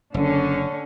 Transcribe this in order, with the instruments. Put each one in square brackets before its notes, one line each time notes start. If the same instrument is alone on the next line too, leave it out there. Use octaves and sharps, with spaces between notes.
[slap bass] F#1 [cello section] D3 C#4